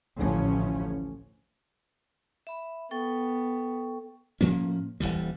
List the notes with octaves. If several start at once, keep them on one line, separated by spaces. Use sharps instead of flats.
A1 D2 A2 F3 C#4
E5 B5
B3 A4 G5 C#6
A2 F3 A#3 C#4
D#1 D2 E3 G3